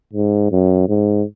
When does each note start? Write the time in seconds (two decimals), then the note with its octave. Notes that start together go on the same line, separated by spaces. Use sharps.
0.13 G#2
0.51 F#2
0.89 G#2